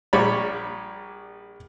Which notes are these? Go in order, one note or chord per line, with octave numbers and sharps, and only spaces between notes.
A#1 G3 C#5 D5 B5